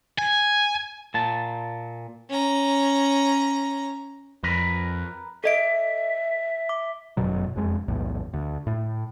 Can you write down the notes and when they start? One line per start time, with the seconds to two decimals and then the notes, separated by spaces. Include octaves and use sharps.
0.19 G#5
1.14 A#2 A5
2.29 C#4 A#5
4.43 F2 A#4 B4
5.44 A4 D#5 E5 D7
6.69 D6
7.17 G1 F#2 B2 F#3
7.56 E1 F2 G#3
7.88 B1 E2 A2
8.34 D2
8.67 A2